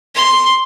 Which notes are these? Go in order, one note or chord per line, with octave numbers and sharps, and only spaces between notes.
C6